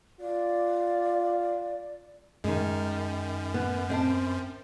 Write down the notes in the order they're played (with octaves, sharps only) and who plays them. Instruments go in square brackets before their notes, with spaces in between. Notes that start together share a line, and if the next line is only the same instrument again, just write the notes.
[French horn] F4 [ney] D5
[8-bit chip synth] F#2 [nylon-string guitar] D#3 G#3
[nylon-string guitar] B3
C4 E5 A5